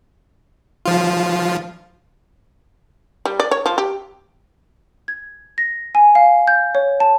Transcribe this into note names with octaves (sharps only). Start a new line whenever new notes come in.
F3 F4
G3
D5
C#5
F3
G4
G#6
A#6
G#5
F5
G6
C#5
A5